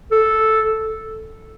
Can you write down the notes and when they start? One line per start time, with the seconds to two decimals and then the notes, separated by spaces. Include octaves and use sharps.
0.12 A4